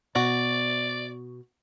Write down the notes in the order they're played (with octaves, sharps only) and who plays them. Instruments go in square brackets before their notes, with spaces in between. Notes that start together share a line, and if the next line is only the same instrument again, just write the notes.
[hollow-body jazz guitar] B2 [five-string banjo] F#4 [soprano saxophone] D5